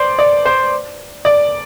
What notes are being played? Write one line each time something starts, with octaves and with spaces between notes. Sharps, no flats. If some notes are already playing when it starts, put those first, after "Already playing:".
Already playing: C5 D5
D5
C5
D5